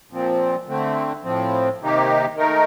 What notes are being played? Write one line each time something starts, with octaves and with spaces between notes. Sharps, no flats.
A#2 F3 C4
D3 A3 C4
A2 F3 C4
C3 D#3 A#3 D#4 G4
D#3 A3 D#4 A#4